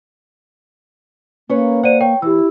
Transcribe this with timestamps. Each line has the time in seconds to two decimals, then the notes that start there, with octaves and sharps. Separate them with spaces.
1.49 A#3 C#4 B4 C#5
1.83 C5 D5 F#5 D#7
2.01 C#5 G5
2.22 E3 E4 G4 E6